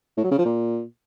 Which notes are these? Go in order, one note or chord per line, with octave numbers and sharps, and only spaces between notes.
A2
F#3
C#3
F3
A#2